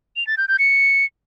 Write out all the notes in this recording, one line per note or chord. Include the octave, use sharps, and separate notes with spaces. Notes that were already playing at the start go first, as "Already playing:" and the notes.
F7
A6
G6
G6
C#7